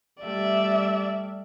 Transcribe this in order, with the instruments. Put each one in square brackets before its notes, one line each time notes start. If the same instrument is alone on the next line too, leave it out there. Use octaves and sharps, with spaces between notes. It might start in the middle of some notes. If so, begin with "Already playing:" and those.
[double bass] G3 A3 [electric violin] D5 E5